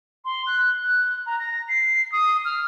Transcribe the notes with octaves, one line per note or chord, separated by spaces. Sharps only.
C6
F#6
F#6
A#5
A#6
C7
D#6
F6